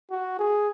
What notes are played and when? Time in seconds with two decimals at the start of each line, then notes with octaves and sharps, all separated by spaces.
0.11 F#4
0.39 G#4